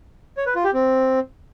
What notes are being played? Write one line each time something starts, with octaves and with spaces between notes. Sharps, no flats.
C#5
B4
F4
G4
C4